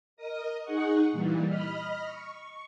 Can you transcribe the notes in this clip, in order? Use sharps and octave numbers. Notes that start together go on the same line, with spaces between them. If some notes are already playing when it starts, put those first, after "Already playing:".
A#4 D#5 D#6
D#4 G#4 F#5 C#6
A#2 E3 G3
D#5 B5 F6
C#6